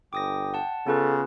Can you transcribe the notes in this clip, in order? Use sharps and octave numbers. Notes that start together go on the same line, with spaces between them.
G1 G5 D6 D#6 A#6
F#5 A5
C#3 B3 F4 A4 B4